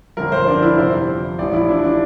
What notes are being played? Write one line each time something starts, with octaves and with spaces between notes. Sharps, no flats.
G1 F2 D3 F3 A#4
C5
D4
E4
G1 F2 C3 F3 C5
A1 A2 F3 D5
E4
D4
D4